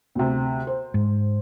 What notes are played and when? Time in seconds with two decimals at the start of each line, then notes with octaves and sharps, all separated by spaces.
0.15 D2 C3
0.67 C5
0.94 G#2